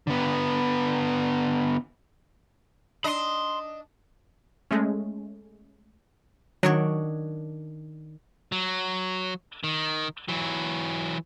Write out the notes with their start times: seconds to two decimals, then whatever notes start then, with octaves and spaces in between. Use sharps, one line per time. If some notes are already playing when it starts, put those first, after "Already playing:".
0.07 D3 B3
3.04 D4 D#5 B5 C6
4.71 G#3 A3 C#4
6.63 D#3 F#3 D4 C#5
8.52 F#3
9.64 D#3
10.28 E3 F#3